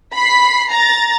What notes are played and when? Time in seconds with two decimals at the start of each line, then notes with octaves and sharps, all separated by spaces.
0.15 B5 B6 C7
0.72 A#5 A6